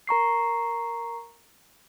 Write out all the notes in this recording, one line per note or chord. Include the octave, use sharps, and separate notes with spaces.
A#4 A#5 C#6 C7